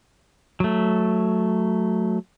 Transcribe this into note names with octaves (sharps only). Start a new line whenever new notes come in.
F#3 A3